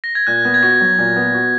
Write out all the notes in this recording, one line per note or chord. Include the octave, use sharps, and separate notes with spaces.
A#6
G#6
A#2 F#6
B3 F#6
G#6
F#4 A#6
F#3
A#2
B3
F#4